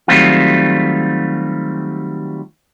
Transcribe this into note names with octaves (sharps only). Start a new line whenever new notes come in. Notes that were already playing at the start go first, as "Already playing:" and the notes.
D#3 F#3 G3 A3 C4 F4